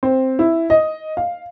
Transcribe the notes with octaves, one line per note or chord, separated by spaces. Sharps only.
C4
E4
D#5
F5